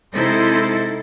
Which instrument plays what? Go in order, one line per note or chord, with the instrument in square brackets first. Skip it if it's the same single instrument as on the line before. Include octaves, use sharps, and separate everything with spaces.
[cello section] C3 G#3 D#4 E4 A4 C5